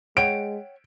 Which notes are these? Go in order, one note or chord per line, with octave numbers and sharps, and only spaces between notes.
G#3 C#5 F#5 G5 D7